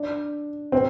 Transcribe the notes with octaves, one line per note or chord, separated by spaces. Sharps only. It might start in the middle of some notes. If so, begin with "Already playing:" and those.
Already playing: D4
C4